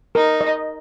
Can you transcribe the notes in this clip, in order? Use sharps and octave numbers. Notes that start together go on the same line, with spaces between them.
D#4 A#4
D#5